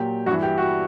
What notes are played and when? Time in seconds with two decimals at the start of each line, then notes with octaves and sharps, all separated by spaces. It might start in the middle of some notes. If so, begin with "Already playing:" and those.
Already playing: A#2 F#3 G4
0.26 G2 F#4
0.31 E3
0.42 G4
0.58 F#4